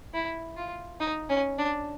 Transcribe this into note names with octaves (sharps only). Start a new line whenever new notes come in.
E4
F4
D#4
C#4
D4